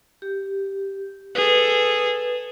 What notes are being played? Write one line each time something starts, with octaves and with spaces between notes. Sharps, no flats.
G4
G#4 A4 B4